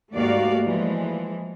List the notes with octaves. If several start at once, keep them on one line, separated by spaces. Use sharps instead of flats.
D#2 G#2 A3 F#4 D5 F5
E3 F3 G#3